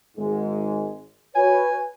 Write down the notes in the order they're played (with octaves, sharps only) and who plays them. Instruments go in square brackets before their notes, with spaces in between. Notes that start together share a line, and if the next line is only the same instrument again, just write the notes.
[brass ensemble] G#1 G#2 G#3
[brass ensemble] F#4 B4 C#5 [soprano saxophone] G#5